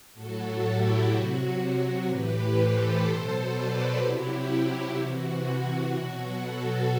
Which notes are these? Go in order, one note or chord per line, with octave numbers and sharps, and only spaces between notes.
A2 F#3 F#4 A4
E4 G4
C3 F#3 F#4
A2 E3 G4 B4
A4 C5
B2 F#3
B4 D5
C3 F#3 E4 G4
C3 E3 F#4
B2 F#3
F#4 A4